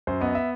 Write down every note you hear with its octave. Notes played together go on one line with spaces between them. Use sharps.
F#2 C5
B3 D#5
E5